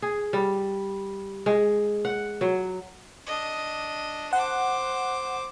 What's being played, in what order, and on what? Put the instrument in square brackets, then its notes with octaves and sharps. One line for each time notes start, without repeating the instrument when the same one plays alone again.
[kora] G#4
G3
G#3
F#5
F#3
[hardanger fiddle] D4 D#5
[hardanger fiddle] C5 D6 [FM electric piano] F#5